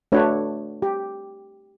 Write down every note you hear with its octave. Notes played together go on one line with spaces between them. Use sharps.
A3 D4 F#4 B4 C#5
G4